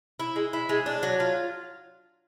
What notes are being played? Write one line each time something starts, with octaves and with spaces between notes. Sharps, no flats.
E4
G#3
E4
G#3
D4
F#3
F4